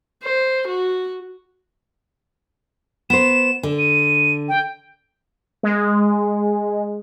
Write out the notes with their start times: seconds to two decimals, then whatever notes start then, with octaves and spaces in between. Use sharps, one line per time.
0.23 C5
0.68 F#4
3.10 B3 C5 E7
3.63 D3
3.79 D#7
4.48 G5
5.63 G#3